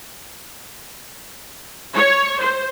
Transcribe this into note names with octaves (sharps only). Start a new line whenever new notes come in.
C#5
C5